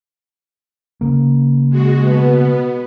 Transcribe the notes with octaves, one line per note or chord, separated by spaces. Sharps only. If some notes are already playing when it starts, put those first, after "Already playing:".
C#3 A#3
G#3 F#4
B2 B3